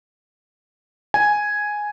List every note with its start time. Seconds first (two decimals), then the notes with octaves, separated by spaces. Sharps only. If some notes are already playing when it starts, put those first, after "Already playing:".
1.14 G#5